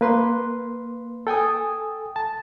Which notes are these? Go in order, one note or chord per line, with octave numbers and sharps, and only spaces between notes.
A#3 B4 C6
A4 G5 G#5 D#6
A5